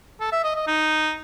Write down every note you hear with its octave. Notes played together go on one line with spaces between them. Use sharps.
A4
E5
D#5
D#5
D#4